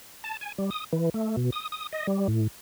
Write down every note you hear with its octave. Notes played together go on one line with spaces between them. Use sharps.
A5
G#5
G3
D#6
E3
A3
B2
D#6
D#6
D#5
G3
A2